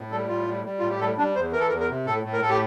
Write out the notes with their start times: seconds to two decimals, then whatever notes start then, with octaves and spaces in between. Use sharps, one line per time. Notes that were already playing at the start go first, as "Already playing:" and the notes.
Already playing: A2
0.11 G3 A4
0.28 A2 F4
0.47 G3
0.64 G3
0.79 A2 F4
0.90 G4
0.99 G3 A4
1.17 G3 D4
1.35 E2 C5
1.52 E3 A#4
1.60 A4
1.68 E2 A#4
1.80 A#4
1.88 C3
2.05 A2 A4
2.23 A2
2.33 A#4
2.41 A2 A4
2.49 G4